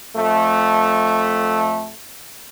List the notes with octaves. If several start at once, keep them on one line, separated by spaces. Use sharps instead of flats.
F2 A3